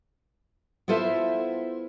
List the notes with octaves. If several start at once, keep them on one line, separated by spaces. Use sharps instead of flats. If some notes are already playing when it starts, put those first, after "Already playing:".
B3 E4 F4 A4 C5 E5